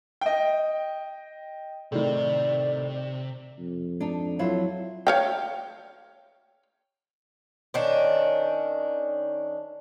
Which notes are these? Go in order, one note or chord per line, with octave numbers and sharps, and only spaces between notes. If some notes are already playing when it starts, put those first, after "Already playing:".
D#5 G5
A2 C3 D#3 D5
F2
D4 D#4
F#3 E4 F4
C#5 F5 G5
D#3 C#4 D4